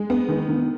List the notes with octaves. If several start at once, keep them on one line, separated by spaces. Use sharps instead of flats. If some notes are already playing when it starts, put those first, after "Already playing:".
Already playing: G#3
B3
D#3
D#3